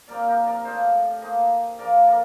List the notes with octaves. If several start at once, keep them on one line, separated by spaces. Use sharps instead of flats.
A#2 G3 C4 D#4 A#4 D5
G4 A#4
A#4 D5
A2 A3 D4 F4 C5 D#5
G2 D#3 A#3 C5 D#5
D3 F3 A#3 A#4 D5
A#4 D5